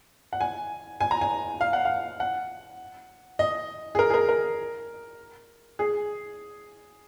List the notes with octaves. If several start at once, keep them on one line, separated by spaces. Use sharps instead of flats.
F#5
G#5
G#5
A#5
G#5
F5
F#5
F5
F#5
D#5
G#4
A#4
G#4
A#4
A#4
G#4